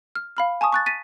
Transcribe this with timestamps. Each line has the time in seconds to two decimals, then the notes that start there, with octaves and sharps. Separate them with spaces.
0.15 F6
0.37 F5 B5 F6
0.61 G#5 A5 C#6 D#6
0.73 C#6 F#6 A6
0.86 A6 B6 D#7